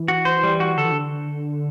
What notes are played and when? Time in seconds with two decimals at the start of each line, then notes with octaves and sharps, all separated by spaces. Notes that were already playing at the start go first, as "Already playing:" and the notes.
Already playing: E3
0.08 F#4
0.25 C5
0.43 G3
0.60 F#4
0.77 D3 A4
0.85 E3
0.92 D3